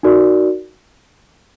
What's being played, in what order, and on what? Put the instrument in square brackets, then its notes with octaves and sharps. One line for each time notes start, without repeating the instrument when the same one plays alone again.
[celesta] D#4 F#4 A#4 D5